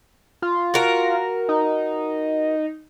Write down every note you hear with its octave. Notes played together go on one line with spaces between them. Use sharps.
F4
F#4 A#4
D#4